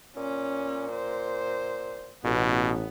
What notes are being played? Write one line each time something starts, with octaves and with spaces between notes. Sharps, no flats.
A#2 C#4
C5
A1 B2 B3